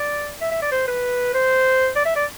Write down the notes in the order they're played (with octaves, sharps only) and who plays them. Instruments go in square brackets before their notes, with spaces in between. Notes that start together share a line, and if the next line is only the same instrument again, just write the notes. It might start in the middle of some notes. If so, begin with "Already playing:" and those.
Already playing: [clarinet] D5
E5
E5
D5
C5
B4
C5
D5
E5
D5